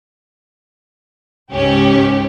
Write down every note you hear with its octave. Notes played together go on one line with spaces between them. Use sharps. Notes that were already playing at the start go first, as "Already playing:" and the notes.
C#2 G#2 C#4 G4